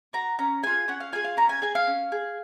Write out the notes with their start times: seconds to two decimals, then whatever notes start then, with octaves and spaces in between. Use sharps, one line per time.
0.13 F#4 A#5
0.39 C#4 A#5
0.63 F4 G#4 G#5
0.88 C#4 F#5
1.00 F5
1.12 F4 G#4 G#5
1.24 F5
1.37 C#4 A#5
1.49 G#5
1.62 G#4 G#5
1.75 F5
1.87 C#4
2.12 G#4